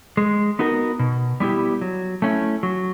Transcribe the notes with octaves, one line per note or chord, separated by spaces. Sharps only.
G#3
B3 D#4 F#4 A#4
B2
G3 B3 E4 G4
F#3
A3 C#4 E4
F#3